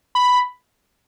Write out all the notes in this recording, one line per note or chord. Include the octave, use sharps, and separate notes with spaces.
B5